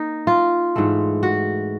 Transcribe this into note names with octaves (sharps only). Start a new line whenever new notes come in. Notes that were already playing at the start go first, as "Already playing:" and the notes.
Already playing: A#3 D#4
F4
G#2 E3 A3
F#4